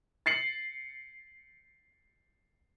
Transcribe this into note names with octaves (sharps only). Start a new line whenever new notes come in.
A6 C7 C#7 F#7